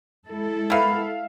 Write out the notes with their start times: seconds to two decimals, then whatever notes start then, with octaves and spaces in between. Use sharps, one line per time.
0.25 G#3 E4 A4
0.70 A#3 B3 E5 F5